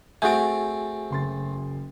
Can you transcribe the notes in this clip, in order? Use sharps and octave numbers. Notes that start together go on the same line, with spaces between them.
A3 C4 F#4 G#4 G#5 G6 A6 D7
F#1 C6 A6